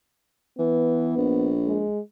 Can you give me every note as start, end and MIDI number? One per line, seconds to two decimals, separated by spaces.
0.58 1.15 52
0.58 1.53 59
1.17 1.84 34
1.67 1.99 56